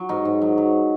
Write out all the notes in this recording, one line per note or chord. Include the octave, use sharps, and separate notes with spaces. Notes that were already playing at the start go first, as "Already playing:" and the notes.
Already playing: F#3
G#2 D#4
G#2
F#3
F#3